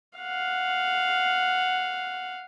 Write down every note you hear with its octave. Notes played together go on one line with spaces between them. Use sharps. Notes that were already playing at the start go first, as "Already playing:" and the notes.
F5 F#5